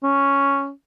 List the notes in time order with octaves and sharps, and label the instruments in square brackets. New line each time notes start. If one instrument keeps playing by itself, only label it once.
[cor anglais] C#4